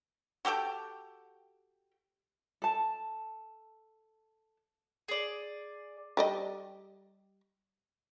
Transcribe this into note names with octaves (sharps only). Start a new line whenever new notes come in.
F#4 G4 A4 G5
A4 A5
G#4 D5
G3 D5 D#5